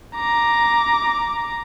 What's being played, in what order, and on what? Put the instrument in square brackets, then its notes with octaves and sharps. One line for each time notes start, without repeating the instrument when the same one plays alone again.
[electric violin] A#5 D6